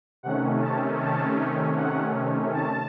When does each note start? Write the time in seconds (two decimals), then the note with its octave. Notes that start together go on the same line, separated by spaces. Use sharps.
0.23 C3 D#3 A3 C#4 F#5
0.62 A5
0.99 A5
1.76 F#5
2.53 A5